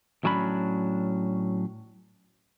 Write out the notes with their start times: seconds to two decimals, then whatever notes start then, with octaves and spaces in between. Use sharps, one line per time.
0.24 A2 F#3 C#4 D4 B5